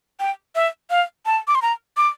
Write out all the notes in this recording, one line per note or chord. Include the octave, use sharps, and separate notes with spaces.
G5
E5
F5
A5
D6
C6
A#5
D6